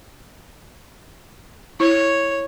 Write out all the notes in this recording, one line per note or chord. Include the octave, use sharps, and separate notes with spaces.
E4 C#5